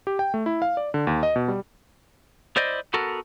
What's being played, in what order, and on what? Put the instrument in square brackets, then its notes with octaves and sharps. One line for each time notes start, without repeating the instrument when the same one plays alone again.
[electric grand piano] G4
G5
A3
E4
F5
D5
D3
D#2
D#5
B2
G3
[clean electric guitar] E4 C5 D5 D#5
B3 F#4 A4 A#4